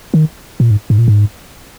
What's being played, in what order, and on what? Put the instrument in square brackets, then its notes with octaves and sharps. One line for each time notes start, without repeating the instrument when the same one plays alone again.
[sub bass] D#3
A#2
G#2
G#2
A#2
G#2